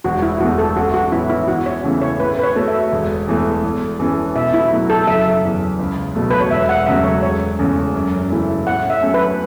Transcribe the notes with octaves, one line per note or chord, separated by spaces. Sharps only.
E1 F#4
E4
E2 E3 A3 F#4
A4
A1 F#4
F#4
A2 E3 B3 E4
E4
E2 F#4
C#5
C#3 E3 A3 E4
C#5
A2 B4
B4
C#5
A3 F#4 A4
E5
E1
E2 E3 A3
E2
E3 C#4 A4
B2 E5
E4
F#3 A3 F#4
A4
F#1 E5
E2 E3
C#2
B2 F#3 A3
B4
C#5
E1 E5
F#5
E2 C#3 F#3 A3 E5
C#5
E1 C#5
E2 C#3 A3 C#4
F#2
C#3 E3 A3 E4
A2 F#5
E5
F#3 A3 C#4
B4